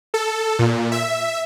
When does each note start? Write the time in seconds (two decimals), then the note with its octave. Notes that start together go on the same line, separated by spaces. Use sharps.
0.14 A4
0.59 A#2
0.92 E5